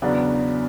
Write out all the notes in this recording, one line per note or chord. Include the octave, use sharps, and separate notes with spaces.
E2 C#3 F#3 B3 D4